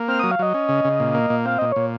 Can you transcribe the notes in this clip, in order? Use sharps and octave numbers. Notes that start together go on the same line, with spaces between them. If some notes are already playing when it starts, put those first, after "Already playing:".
Already playing: A#3
C4 F6
F#3 D#6
F5
F#3 D#5
C#4
C#3
C#3
A#2
A#3
A#2
C4 F5
A#2 D#5
A#2 C#5